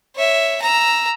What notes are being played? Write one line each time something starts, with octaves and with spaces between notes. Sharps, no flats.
C#5 E5
A#5 E6